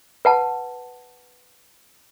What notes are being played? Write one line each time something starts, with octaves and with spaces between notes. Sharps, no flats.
B4 F#5 A5